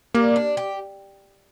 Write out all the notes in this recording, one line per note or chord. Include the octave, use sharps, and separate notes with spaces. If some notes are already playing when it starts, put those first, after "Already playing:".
G3 A#3
D4
G4